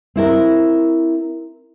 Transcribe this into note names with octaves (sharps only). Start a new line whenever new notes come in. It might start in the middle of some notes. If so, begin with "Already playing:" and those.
C4 E4 A#4